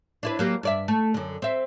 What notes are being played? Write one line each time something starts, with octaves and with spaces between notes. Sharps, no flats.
D4 E4 B4
F#3 A#3 G4
G2 D5 E5
A3
F#2 D3
C4 E5